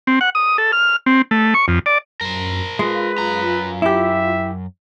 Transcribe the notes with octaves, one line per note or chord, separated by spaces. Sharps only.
C4
F#5
D#6
A4
F6
C4
A3
C#6
F2
D5
F#2 A#4 C5
G#3 F4 B4
F#2 A#5
E4 G4 E5